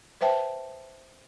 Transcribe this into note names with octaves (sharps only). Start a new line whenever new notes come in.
B4 C5 E5 G5 A5